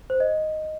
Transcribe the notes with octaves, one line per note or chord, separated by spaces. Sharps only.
C5
D#5